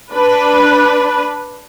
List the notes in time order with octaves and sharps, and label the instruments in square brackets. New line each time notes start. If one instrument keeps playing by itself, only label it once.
[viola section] D4 B4